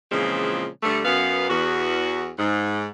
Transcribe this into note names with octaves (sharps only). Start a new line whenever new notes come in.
A#2 C#3 E3 F3 G#3 C4
G2 D3 G3 A3
F#2 B3 F5
E2 F#4
G#2